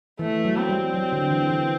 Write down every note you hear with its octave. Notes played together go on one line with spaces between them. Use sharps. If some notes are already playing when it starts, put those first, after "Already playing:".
E3 A3
F#3
C4
G3
F#3
D3
E3
E3